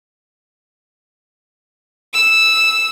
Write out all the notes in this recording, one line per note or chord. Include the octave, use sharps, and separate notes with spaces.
E6